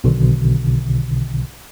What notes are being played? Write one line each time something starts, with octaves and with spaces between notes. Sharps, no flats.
B1 B2 D3 D#3